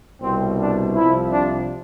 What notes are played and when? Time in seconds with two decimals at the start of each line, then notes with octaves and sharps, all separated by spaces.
0.20 C2 B2 C4
0.58 D4
0.94 C2 C3 F3 E4
1.32 D4